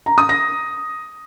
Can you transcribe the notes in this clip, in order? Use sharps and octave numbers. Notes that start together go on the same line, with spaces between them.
A#5
D#6
A#6